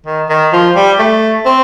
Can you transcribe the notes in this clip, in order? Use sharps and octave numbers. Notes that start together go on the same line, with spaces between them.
D#3
D#3
F3
G3
A3
C4